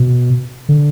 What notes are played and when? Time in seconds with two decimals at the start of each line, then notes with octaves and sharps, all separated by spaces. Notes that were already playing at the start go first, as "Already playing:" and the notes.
Already playing: B2
0.69 D3